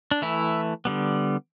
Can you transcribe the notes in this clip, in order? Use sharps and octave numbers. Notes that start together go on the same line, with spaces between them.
D4
E3 A3 E4
D3 G3 B3